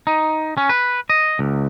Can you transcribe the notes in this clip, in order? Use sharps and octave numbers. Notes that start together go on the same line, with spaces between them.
D#4
C#4
B4
D#5
C#2